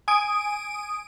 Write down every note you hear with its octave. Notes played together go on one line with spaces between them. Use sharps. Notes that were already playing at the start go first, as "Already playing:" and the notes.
G#5 D#6 D7